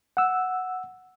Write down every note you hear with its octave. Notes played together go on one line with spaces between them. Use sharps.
F#5 E6